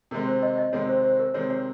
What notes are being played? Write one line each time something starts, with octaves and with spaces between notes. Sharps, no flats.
C3 D#3 G#3 C4 A#4
C5
D#5
D#5
C3 D#3 G#3 C4 C#5
C5
C5
A#4
C3 D#3 G#3 C4 C#5
C#5